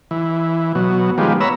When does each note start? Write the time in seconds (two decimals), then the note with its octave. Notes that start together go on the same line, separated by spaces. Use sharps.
0.11 E3
0.75 B2 F#3
1.18 D#3 F3 G3 G#3 B3
1.41 B3 C#5 A#5 B5 E6